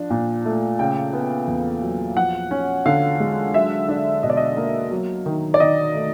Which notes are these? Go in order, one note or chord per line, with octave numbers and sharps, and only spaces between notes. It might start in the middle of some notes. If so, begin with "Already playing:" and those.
Already playing: F3 D4
A#2
A3
C#3 G5
B3
E2
F#3
F3 F#5
C#4
D3 F5
G#3
F#3 E5
D4
B2 D#5
D5
D#5
A#3
F#3
D#3
D5
D#3 D#5
A3